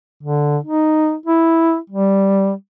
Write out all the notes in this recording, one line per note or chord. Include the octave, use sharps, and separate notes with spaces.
D3
D#4
E4
G3